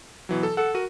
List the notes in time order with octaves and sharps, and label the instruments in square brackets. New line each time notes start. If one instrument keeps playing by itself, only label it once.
[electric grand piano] B2 E3 F#3
A4
[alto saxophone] A4 [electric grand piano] F#5
[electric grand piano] F#4 A#4 D#7